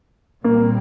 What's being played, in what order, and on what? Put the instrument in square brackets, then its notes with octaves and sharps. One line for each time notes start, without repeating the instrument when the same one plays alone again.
[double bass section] A#2 G3 C4 [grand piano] A#3